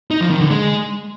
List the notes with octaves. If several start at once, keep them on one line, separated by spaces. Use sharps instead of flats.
D#4
F3
D#3
D3
G#3